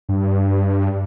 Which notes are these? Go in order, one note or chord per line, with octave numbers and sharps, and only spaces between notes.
G2